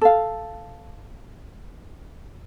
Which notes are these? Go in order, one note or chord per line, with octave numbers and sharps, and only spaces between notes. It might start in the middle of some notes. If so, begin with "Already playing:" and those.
A4 F5